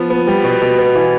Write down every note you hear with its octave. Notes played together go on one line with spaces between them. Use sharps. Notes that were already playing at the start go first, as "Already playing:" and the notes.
Already playing: F3 B3
B3
G3
B2
B2
B3
E3